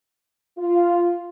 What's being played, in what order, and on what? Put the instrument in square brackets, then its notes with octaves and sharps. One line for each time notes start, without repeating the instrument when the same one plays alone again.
[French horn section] F4